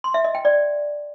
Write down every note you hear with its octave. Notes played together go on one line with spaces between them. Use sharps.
C6
E5
D#5
G5
D5